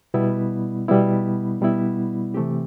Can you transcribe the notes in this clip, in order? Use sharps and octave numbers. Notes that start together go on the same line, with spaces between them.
B2 G3 B3 E4
B2 G3 B3 E4
B2 G3 B3 E4
C3 E3 A3 C4 G4